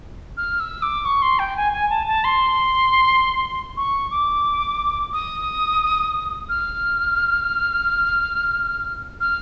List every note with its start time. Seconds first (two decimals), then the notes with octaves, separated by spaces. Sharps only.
0.37 F6
0.60 E6
0.82 D6
1.05 C#6
1.22 C6
1.39 G5
1.57 G#5
1.73 G#5
1.90 A5
2.07 A5
2.24 C6
3.77 C#6
4.11 D6
5.13 D#6
6.49 F6
9.21 F6